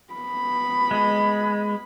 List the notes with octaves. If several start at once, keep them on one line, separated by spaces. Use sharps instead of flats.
B3 B5
G#3